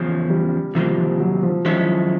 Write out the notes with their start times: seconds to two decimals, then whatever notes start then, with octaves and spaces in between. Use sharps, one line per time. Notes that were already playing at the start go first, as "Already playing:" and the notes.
Already playing: E2 C#3 F3 C#4
0.30 G3
0.75 C3 D#3 F3 G3 A#3
0.98 F3
1.20 F#3
1.43 F3
1.65 F#2 D#3 F3 G#3 C#4 E4